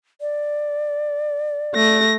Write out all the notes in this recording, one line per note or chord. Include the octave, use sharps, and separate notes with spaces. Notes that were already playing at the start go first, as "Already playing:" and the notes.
D5
A3 A#6